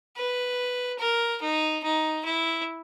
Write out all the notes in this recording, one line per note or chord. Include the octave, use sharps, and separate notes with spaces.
B4
A#4
D#4
D#4
E4